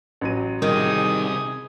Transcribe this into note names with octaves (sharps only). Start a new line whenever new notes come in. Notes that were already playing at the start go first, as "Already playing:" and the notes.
A1 F#3 D#7
C3 D#3 G3 G#4 D#6